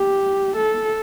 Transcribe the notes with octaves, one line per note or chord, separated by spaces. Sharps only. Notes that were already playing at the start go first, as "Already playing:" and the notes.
Already playing: G4
A4